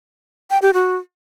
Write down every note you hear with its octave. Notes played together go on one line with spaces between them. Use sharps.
G5
G4
F#4